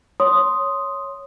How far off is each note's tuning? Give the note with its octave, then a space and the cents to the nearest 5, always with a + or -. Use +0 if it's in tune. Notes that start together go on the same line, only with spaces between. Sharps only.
C#5 +0 C6 +0 D#6 +0